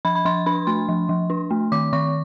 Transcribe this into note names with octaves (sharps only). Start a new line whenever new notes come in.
F3 B5
B5
F3 C6
D4 B5
A3 C6
F3
F3
D4
A3
D#3 D6
D#3 C#6